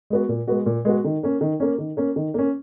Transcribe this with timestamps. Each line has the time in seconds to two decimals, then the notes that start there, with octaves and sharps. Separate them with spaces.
0.10 G#3 B3 F#4
0.29 A#2
0.48 G#3 B3 F#4
0.66 A#2
0.85 G#3 B3 F#4
1.04 D#3
1.23 A#3 C#4
1.41 D#3
1.60 A#3 C#4
1.78 D#3
1.97 A#3 C#4
2.16 D#3
2.34 A#3 C#4